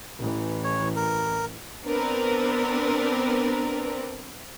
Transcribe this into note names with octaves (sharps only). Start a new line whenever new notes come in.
A1 E3
C#5
A#4
B3 C4 D4 A#4 B4